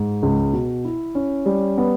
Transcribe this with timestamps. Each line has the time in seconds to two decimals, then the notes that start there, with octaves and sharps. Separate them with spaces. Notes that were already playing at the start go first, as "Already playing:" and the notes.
Already playing: G#2
0.23 C#2
0.53 B2
0.85 E4
1.15 C#4
1.46 G3
1.78 B3